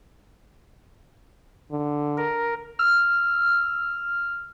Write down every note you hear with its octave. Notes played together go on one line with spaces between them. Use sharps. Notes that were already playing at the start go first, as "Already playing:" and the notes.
D3
A#4
E6 F6